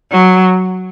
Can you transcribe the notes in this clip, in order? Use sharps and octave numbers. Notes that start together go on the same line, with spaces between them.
F#3